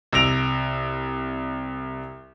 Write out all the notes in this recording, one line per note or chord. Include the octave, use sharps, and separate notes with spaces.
C2 E6 A#6 D7 F7